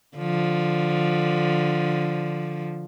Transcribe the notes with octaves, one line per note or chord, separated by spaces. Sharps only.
D3 F3